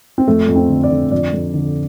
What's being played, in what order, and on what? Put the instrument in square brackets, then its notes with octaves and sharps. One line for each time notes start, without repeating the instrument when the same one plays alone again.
[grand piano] C4
F2 A3
F2
C4
D3
D5
D3
F2 D5
F2
D3